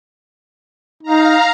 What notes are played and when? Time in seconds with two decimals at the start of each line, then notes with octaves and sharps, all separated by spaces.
1.03 D#4 F5 A#5